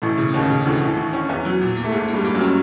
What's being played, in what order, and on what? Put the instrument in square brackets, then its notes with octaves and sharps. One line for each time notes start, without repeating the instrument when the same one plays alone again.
[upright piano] A1 A2 [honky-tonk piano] E3
[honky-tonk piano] C#3
[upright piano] D#2 D#3 [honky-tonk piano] C#4
[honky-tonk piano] C#3
[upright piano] D2 D3 [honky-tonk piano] E3
[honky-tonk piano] E3
E3
C#4
[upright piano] E2 E3 [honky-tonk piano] C#4
[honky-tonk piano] F#3
A#2
A#3
[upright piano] A3
[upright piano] G#2 G#3 [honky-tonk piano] A#3
[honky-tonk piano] A#3
[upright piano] G2 G3
[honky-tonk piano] A#3
[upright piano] F#2 F#3
[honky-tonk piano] C#4